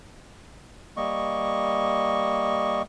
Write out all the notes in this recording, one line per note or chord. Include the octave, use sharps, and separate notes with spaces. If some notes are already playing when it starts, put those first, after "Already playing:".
G3 A#3 D#5 C#6